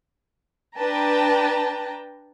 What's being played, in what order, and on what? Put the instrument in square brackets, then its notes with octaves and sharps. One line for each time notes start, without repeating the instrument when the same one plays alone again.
[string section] D4 B4 G5 A5 A#5